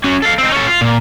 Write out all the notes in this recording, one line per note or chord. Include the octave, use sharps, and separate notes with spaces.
C#4 F#4
A4 F5
C4 D#4
C#4 A4
F4
A#2